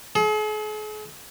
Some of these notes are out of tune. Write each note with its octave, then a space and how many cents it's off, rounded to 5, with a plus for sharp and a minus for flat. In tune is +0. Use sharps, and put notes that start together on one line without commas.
G#4 +45